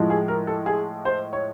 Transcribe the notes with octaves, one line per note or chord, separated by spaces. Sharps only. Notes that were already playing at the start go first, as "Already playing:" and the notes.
Already playing: A2 F3 G#3
G#4
A#4
A4
G#4
C5
C#5